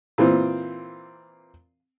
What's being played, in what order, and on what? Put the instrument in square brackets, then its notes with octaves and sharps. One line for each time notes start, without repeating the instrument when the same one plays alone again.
[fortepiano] A#2 E3 C4